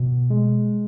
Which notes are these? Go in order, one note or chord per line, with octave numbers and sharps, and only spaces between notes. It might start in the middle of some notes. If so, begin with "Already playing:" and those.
Already playing: B2
G#3